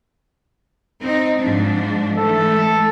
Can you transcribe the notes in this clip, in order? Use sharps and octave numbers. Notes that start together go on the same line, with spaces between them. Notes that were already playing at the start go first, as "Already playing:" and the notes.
C4 D#4
G#2 F3 D4
E3 A3 A4